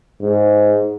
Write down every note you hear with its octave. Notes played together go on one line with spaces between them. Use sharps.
G#2